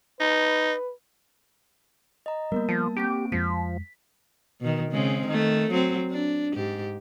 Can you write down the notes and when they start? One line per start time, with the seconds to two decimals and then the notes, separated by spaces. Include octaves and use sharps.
0.20 D#4 B4
2.26 D#5 A#5
2.52 G3 A#3 B3 A#4
2.69 F3 A5
2.97 A#3 C4 G4 D7
3.32 F2 F3 G#3 B6
4.60 B2 D#3
4.91 C#3 G#3 C4
5.26 D#3 A3
5.70 F#3 C4
6.11 D4
6.54 G#2 G4